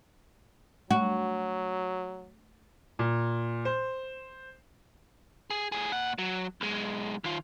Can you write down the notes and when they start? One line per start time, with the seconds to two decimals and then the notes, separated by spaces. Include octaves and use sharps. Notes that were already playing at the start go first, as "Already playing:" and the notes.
0.91 F#3 A3 F#4
2.99 A#2
3.65 C5
5.51 G#4
5.72 A2 G#4
5.92 A#2 F#5
6.18 F#3
6.61 B1 G#3
7.24 D#3 F4